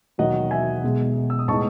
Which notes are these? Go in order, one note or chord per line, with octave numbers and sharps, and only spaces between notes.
E1 D#2 D#3 F#3 D#5 F#5
E5 G#5
B1 B2 G#3
E6
D#6
A2 G#3 B3 D#4 A5 C#6